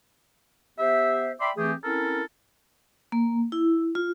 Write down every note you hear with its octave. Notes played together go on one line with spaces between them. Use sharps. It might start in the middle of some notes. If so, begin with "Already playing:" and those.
B3 G4 C5 E5
D5 E5 G5 B5 C6 D6
E3 A3 C4 G4 G#4
C4 C#4 E4 A4 A#4
A#3
E4
F4